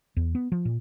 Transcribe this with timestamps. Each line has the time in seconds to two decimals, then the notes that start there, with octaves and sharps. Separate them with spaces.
0.17 E2
0.35 B3
0.52 F3
0.65 A#2